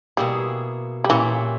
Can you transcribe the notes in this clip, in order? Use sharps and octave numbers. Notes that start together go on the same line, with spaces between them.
B2 G3 A#3 E4 G#4
G3
A#2 E3 A#3 C#4 E4 G4